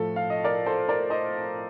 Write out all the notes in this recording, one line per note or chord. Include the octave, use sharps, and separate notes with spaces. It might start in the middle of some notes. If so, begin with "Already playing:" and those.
Already playing: A2 F3 A3 A4
F5
D#5
A#4 D5
A4 C5
A#4 D5
C5 D#5